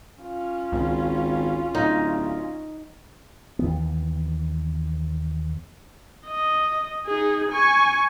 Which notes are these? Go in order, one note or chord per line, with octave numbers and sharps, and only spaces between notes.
C#4 F4
G#1 C#2
D1 D#4
D#2 E3 B3
D#5
D#4 G#4
G#5 C#6